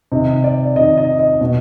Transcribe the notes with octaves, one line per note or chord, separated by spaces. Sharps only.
C3 D#3 D#5
D5
C3 D#3 D#5
D#5
D#5
B2